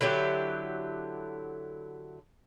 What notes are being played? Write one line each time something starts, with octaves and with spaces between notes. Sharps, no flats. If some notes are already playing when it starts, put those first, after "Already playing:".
D3 F#3 E4 G4